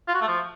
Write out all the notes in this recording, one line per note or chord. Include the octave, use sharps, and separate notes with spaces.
F4
F#4
A3
F3